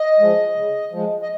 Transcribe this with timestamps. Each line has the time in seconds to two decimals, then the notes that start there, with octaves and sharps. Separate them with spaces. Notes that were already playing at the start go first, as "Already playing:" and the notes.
Already playing: D#5
0.20 F3 G#3
0.56 C#3
0.92 F3 G#3
1.22 D#5